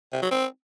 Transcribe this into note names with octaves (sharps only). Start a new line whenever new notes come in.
C3
F#3
C4